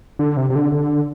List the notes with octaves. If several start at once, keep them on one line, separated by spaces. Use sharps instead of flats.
D3
C3
C3
D3
D3